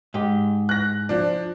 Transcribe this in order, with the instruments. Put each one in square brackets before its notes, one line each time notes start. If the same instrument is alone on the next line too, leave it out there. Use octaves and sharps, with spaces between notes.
[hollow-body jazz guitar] G#2 G4
[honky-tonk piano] F#6 A#6
F3 D4